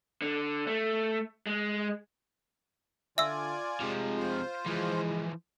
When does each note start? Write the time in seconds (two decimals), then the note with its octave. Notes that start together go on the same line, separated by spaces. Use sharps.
0.22 D3
0.67 A3
1.47 G#3
3.18 D3 F4 D5 E5 G#5 E6
3.81 C3 F3 G#3
4.17 F4 C5
4.66 E3 F3 G#3